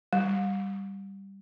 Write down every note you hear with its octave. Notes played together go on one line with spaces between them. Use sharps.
G3